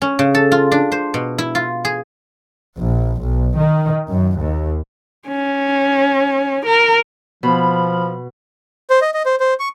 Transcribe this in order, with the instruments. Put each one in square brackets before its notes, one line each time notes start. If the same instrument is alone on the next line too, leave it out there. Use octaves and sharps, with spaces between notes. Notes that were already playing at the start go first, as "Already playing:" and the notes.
[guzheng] C#4
C#3
A4
F4
D4
C5
B2
E4
F4
G#4
[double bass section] A#1
B1
D#3
F#2
D#2
[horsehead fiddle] C#4
A#4
[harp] B2 [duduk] F3 [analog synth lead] B5
[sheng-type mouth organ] C5
D#5
D#5
C5
C5
C#6